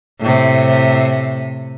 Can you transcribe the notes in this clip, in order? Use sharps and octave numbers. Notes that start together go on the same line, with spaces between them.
A2 C3